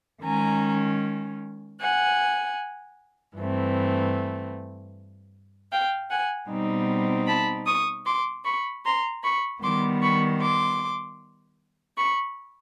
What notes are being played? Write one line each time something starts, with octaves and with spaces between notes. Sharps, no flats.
D#3 G#3 C#4 G#5 A#5
F#5 G#5
G2 E3 A3 C4
F5 G5
F#5 G#5
B2 G3 C4 D#4
A5 B5
C#6 D#6
C6 D6
B5 C#6
A#5 C6
B5 C#6
D#3 G3 B3 C6 D6
B5 C#6
C6 D6
B5 C#6